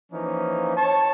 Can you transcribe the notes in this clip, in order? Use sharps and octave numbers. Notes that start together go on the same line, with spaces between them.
E3 F3 A#3 C#4 D#4
C#5 A5